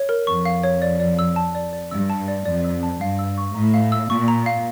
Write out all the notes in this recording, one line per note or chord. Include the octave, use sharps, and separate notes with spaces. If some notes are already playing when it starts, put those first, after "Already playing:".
Already playing: C#5
A#4
F2 C#6
F5
C#5
D5
D5
E6
A5
D5
D5
G2 E6
A5
D5
F2 D5
E6
A5
G2 F5
E6
C#6
A2 A#5
F5
E6
A#2 C#6
A#5
F5